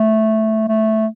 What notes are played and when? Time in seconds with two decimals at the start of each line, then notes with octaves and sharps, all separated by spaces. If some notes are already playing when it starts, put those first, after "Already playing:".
Already playing: A3
0.68 A3